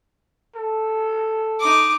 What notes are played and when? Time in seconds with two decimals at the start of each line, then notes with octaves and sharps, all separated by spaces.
0.56 A4
1.60 D#4 D6